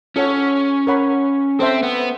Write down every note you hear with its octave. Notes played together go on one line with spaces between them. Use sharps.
C#4 F4 A4 C#5 F#5
A#4 C#5 F#5 B5
C4 A4 C5 E5
B3